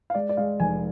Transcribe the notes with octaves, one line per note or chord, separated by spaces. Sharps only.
F5
G#3 D5
D5
G#3 F5
F1 G#5